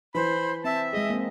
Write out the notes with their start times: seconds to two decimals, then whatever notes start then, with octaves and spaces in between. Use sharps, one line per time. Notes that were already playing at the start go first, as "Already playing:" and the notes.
0.15 E3 C5 B5
0.64 C4 E5 A5
0.93 G#3 G#4 D#5
1.10 A#3 C4